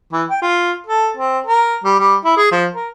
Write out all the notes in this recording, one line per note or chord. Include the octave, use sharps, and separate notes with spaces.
E3
G5
F4
A4
C4
A#4
G3
G3
E4
G#4
F3
A#4